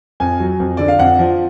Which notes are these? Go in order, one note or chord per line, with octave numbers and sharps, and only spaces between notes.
F2 G#5
F#3
F2
D3 D5
F5
F2 F#5
F3